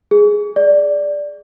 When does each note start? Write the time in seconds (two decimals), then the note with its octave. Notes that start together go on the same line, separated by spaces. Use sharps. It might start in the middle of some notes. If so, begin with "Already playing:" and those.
0.11 G#4
0.56 D5